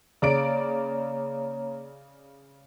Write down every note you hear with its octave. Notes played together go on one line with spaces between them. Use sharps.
C#3 A#3 C#5 D5 A#5 D7